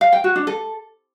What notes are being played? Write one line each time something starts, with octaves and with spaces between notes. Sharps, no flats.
F5
G5
F#4
D4
A4